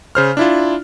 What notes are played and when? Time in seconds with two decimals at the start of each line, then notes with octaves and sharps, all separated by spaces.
0.15 C#3 C5 F6
0.37 D4 E4 F4